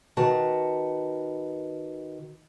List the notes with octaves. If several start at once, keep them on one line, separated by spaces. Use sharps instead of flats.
D#3 F#4 B4 A5